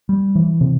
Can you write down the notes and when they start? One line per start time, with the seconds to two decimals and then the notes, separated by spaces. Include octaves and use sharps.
0.09 G3
0.35 E3
0.61 C3